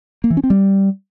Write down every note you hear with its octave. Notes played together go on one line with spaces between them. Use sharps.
A#3
E3
C#4
C4
G3